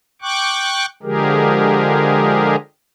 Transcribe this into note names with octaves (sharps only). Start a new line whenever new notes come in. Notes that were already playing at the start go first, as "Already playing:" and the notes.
G5 C#6 D6 F#6
D3 F3 G#3 G4 G#4 A#4